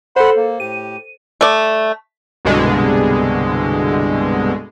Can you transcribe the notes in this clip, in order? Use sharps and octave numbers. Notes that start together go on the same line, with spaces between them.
A4 C5 F#5 B5 C6
A#3
A2 G4 D#7
A3 D5
C2 G2 B2 D3 G#3